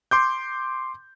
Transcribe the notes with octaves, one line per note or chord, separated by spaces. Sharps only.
C6 D6 G6